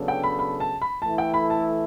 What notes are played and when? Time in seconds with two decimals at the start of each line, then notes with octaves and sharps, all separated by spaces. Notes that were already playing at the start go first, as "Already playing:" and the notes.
Already playing: C#3 F#3 B3 D4 A4
0.08 G5
0.24 B5
0.39 B5
0.60 A5
0.82 B5
1.02 E3 A3 E4 A4 A5
1.18 G5
1.34 B5
1.50 A5